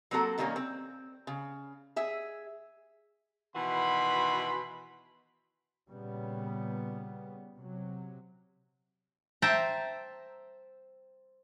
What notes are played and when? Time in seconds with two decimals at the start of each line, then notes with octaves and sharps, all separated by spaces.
0.11 F#3 A#3 C4 F#4 A4
0.38 B2 D#3 G3 G#3 A#3 C#4
0.56 C4
1.27 C#3
1.96 G#4 E5
3.55 B2 D#3 E3 F#4 B5 C6
5.88 A#2 C#3 G3 B3
7.56 C3 F#3
9.42 C5 E5 G5 A5 A#5